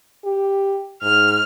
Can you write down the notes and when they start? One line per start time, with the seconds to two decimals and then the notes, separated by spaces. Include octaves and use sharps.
0.25 G4
1.03 G#2 F6